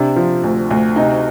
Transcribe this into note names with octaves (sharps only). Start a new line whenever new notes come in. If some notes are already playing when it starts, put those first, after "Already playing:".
Already playing: C3 D4
F3
D2
D2
C3 D#4